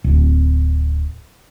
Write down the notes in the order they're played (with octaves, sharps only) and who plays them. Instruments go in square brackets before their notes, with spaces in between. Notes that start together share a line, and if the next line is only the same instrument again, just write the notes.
[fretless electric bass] D1